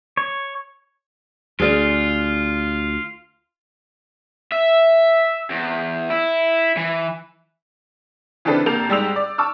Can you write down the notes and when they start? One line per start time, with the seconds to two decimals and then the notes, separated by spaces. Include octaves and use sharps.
0.17 C#5
1.60 D2 F4 G#4 D5
4.52 E5
5.50 E2
6.10 E4
6.77 E3
8.45 C#3 E3 C4 D4 A4 B4
8.66 F1 A#3 A4 A#4 G6 F7
8.89 G#2 G3 G#3 E6 F7
9.16 D5
9.38 A5 C#6 D6 E6 F6